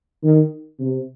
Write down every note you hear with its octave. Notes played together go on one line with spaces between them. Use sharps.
D#3
C3